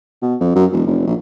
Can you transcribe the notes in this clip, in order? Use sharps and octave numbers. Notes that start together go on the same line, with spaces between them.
B2
F2
F#2
E1
F1
A#1